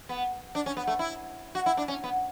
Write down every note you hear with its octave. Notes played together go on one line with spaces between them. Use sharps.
B3
D4
C#4
B3
A3
E4
F#4
E4
D4
C#4
B3